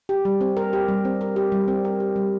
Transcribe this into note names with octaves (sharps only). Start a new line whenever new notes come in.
G4
G3
C4
A#4
G4
G3
C4
A#4
G4
G3
C4
A#4
G4
G3